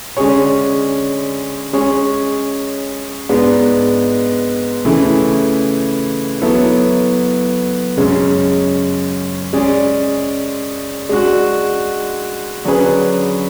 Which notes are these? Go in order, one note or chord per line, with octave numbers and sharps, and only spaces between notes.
D3 G#3 C#4 G#4 C#5
G#3 C#4 G#4 C#5
G#2 G#3 B3 D4
C#3 E3 A3 E4
F#3 B3 E4 A4
F#2 C#3 G#3 C#4
G#3 C#4 G#4 D5
G#3 D4 F#4
D3 F#3 C#4 G#4 B4